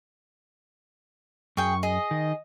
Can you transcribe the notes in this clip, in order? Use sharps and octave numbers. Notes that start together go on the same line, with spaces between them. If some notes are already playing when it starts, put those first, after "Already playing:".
F#2 G#4 G5 C#6
G#4 D#5
D#3